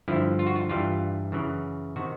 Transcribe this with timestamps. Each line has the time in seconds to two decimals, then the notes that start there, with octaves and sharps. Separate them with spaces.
0.08 G2 D3 F3 E4
0.39 F4
0.47 F#4
0.56 F4
0.69 G2 E3 G3 F4
1.32 F#2 C#3 E3
1.96 C3 D#3 F#4